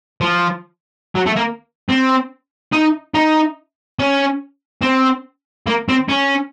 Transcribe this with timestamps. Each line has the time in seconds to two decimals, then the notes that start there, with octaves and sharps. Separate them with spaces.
0.21 F3
1.15 F#3
1.26 A3
1.36 A#3
1.89 C4
2.72 D#4
3.14 D#4
3.99 C#4
4.83 C4
5.67 A#3
5.89 C4
6.09 C#4